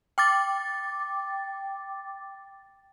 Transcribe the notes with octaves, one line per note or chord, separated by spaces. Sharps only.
G5 D6 A6